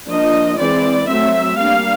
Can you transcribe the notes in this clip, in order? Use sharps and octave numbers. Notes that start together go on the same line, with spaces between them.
F3 A#3 D4 D#5
E3 G#3 C4 E4 D5
F#3 A3 C4 E5
G3 A#3 D4 F5